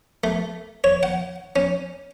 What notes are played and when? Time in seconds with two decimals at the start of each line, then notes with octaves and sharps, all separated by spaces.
0.24 A3
0.84 C#5
1.03 F#5
1.56 C#4